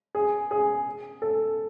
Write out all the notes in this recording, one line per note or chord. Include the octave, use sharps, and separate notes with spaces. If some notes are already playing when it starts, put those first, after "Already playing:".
G#4
G#4
A4